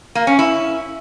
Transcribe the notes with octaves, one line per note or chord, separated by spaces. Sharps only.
A#3
C#4
E4